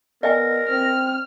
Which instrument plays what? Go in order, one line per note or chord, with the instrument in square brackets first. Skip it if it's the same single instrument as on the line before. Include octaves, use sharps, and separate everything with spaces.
[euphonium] B3 [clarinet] A#4 [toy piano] D5 D#5 G#5
[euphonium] C4 [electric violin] F6